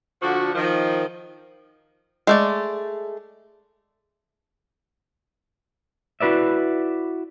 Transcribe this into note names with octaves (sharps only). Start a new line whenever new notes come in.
D3 F3 F#4
D#3 F3
G#3 A3 D5
E4 F#4 B4 D5 E5